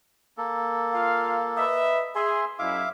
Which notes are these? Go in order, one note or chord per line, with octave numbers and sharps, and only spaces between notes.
A#3 A4
F4 F5
B4 D#5 E5
G#4 E5 C6
F#2 D#4 E4 E5 F5 D6